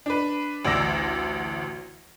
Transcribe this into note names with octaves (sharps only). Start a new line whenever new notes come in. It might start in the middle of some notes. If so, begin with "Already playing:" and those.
D4 B4
A1 D2 D5 E6 A#6